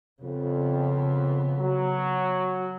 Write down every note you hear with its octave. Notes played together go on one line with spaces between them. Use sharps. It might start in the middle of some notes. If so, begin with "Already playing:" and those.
F2 C#3 B3
F#3